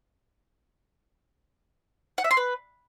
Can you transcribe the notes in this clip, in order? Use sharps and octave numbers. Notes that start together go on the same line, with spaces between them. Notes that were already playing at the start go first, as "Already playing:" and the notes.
F#5
E5
C6
B4